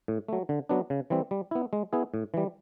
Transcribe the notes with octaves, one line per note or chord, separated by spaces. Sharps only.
A2
F#3 A3
D3
F#3 B3 D4
C#3
E3 G3 C4
G3
B3 E4
G#3
B3 E4 G#4
A2
E3 G3